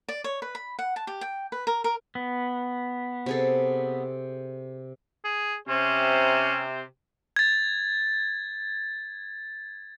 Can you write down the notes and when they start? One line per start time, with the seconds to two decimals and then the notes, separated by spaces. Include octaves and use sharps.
0.08 D5
0.24 C#5
0.42 B4
0.55 B5
0.79 F#5
0.96 A5
1.07 G4
1.21 G5
1.52 B4
1.67 A#4
1.84 A#4
2.15 B3
3.26 C3 G#4 A4
5.25 G#4
5.69 C3 C#4 C5
7.36 G#6 A6